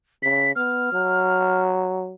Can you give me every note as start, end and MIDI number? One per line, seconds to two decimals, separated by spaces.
0.23 0.54 49
0.23 0.52 95
0.56 0.91 59
0.56 1.62 89
0.92 2.15 54